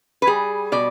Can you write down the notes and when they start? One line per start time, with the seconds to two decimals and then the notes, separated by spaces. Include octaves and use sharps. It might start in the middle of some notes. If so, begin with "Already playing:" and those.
0.22 B4
0.27 G3 G#4
0.72 B2 D5